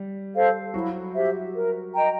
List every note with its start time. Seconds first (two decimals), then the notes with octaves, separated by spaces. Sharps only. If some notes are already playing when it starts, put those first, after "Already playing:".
Already playing: G3
0.34 A4 C5 F5
0.74 F#3 E4 F#4
1.14 G4 C5 E5
1.55 A#4
1.94 D#5 G5 A#5